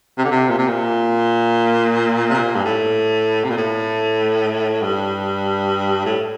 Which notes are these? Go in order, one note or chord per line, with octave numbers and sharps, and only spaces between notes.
C3
D3
C3
A#2
C3
A#2
C3
A#2
G2
A2
C3
A#2
A2
G2
A2